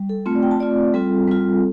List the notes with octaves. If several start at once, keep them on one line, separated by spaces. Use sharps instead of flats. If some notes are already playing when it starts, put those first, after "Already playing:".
Already playing: G3
A4
A3 C4 F4
D5
G5
A5
A3 C4 F4 D5
G3 C4 F4 A4
G3 C4 F4